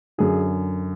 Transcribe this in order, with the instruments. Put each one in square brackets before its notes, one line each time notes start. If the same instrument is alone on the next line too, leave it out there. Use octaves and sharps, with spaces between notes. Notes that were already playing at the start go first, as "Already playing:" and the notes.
[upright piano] F#2 D3 G#4